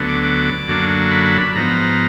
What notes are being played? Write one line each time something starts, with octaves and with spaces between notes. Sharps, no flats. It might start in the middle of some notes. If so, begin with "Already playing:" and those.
Already playing: D2 D3 F#3 B3
D6
D6
F#2 D3 F#3 A#3 D4
B5
B5
B5
G#2 F3 B3 A#5